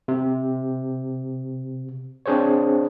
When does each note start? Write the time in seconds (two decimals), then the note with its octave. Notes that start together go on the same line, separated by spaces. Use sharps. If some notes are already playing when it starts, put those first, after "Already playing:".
0.08 C3
2.26 C4 D4 G#4 C5 C#5